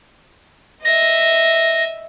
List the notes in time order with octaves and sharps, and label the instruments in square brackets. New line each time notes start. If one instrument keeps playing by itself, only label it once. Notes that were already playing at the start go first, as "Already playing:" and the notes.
[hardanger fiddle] D#5 E5 [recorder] A#6